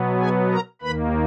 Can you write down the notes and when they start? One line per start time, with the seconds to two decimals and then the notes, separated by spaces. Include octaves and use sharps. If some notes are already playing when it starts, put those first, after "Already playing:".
Already playing: B2 F#3 B3
0.20 G#4 G#5
0.51 A#4 A#5
0.82 D#2 D#3 A#3 B4 B5